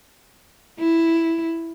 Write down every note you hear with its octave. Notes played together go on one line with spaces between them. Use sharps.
E4